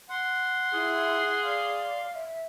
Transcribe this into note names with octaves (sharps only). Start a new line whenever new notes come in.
F#5 C6
E4 G#4
D5 F5
E5